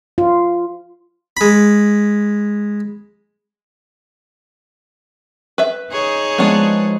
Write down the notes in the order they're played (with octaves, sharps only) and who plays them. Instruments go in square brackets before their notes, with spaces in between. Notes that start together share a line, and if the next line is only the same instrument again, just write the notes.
[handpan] F4
[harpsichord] G#3 B5
[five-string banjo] B4 E5
[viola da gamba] D#4 G#4 C#5
[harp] F3 G#3 [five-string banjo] B3 D4